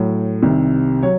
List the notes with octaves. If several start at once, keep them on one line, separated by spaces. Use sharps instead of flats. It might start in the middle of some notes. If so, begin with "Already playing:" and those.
Already playing: A2 F#3
C2 C3 D#3
F#3 C#5